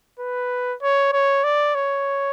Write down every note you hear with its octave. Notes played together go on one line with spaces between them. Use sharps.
B4
C#5
C#5
D5
C#5